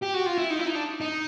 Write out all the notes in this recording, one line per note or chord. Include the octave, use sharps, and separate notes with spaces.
G4
F#4
F4
E4
D#4
E4
D#4
D4
D#4